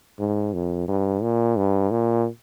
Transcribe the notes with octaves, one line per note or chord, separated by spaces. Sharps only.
G#2
F2
G2
A#2
G2
A#2